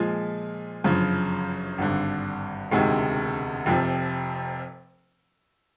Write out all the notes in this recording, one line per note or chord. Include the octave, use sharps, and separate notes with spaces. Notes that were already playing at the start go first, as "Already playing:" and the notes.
Already playing: A#2 F3 G#3
G1 F#2 C#3 F3
G#1 G2 D3
E1 D2 C3 D#3 G#3
F1 F2 C3 F3